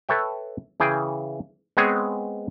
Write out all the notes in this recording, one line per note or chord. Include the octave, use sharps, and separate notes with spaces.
A4 B4 C#5 E5 G5
C#3 E3 G#4 G5
G#3 B3 C4 G#4 C#5